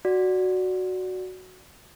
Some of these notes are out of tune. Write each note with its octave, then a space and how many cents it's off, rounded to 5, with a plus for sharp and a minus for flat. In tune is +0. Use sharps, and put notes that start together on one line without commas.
F#4 +0 D5 +0